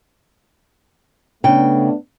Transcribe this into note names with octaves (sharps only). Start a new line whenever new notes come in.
C#3 A3 B3 D4 G5